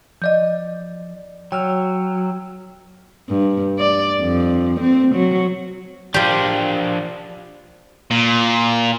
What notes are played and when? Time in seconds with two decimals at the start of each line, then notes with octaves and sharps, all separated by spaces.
0.22 F3 D5 D#5 G6
1.52 F#3 G5 E6 F6
3.29 G2
3.79 D5
4.21 F2
4.80 C4
5.15 F#3
6.14 F3 D4 F4 G4
8.11 A#2